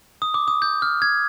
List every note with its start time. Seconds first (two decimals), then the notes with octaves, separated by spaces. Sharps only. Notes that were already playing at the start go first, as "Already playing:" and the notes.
0.22 D#6
0.34 D6
0.48 D#6
0.62 G6
0.82 F6
1.02 G#6